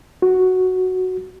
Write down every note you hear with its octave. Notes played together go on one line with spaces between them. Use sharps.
F#4